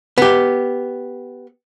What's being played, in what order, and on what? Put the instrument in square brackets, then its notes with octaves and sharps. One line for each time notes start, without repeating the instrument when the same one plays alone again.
[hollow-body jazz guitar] B3 G4